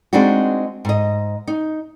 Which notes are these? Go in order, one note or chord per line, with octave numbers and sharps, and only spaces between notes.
G#3 C4 D4 D#4 F#4
G#2 D#5
D#4